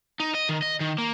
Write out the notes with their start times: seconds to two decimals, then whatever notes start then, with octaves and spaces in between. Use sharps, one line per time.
0.20 D#4
0.35 D#5
0.49 D#3
0.62 D#5
0.80 D#3
0.98 A#3